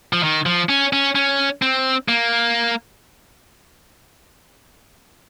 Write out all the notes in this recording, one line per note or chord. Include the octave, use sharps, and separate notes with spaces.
F3
D#3
F3
C#4
C#4
C#4
C4
A#3